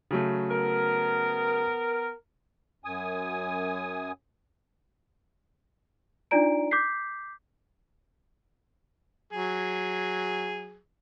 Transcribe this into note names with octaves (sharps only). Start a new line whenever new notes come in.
C#3 F#3 A3
B3 A#4
F#2 G#5 D#6
D4 D#4 F4 D5 A#5 D7
D6 G6 B6 C7
F#3 G#4